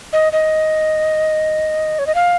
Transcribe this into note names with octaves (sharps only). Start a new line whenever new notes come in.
D#5
D#5
C#5
D#5
F5